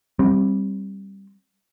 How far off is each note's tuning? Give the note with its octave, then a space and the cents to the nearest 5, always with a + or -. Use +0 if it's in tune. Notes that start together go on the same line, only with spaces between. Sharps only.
G3 +0 C4 +25